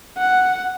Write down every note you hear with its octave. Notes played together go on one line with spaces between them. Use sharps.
F#5